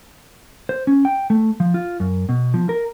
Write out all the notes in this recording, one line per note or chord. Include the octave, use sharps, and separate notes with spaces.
C5
C#4
G5
A3
F3
F4
F#2
B2
F3
A#4